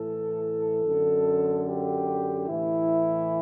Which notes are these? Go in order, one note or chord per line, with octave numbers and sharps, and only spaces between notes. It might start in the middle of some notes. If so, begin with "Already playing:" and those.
Already playing: A2 E3 A4
F#2 D3
G4
A2 E3 E4